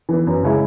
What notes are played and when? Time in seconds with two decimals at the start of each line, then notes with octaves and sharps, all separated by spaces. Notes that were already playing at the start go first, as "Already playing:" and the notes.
0.09 E3 B3
0.27 F#2
0.43 C#3 G#3 C#4 E4